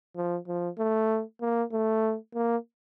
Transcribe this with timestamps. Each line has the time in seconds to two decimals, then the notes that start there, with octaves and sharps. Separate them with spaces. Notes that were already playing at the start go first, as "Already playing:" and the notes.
0.16 F3
0.47 F3
0.78 A3
1.41 A#3
1.72 A3
2.35 A#3